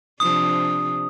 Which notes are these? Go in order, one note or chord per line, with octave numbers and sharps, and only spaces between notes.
C3 F3 D4 D#6